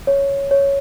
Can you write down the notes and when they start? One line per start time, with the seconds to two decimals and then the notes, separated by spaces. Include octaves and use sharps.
0.07 C#5
0.51 C#5